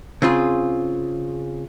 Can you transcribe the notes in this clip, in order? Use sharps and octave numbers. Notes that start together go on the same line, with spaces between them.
C#3 C4 F4 G#4